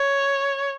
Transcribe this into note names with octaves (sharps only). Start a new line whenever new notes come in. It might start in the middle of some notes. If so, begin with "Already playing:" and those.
Already playing: C#5